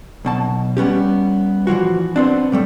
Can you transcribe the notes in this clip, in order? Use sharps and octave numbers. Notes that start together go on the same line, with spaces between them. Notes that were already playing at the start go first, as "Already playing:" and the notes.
B1 B2 A5
G3 B3 C#4 G4
A#2 E3 F3 F#4
B3 C4 D4
A2 G3 A3